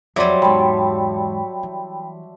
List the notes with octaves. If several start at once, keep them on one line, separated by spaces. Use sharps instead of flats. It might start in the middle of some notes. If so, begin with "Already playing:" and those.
F2 F#3 G3 C5 D5 E5
E2 G#2 G5 A5 B5 C#6
E3